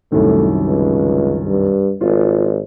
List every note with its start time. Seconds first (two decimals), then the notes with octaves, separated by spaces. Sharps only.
0.12 C2 F#2 A2 D#3
0.67 C#2
1.46 G2
2.01 G#1 F4